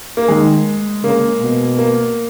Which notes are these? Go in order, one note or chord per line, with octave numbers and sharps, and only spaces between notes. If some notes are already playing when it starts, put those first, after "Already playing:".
A#3
D#3 G#3
C#3 A#3
B2
A#3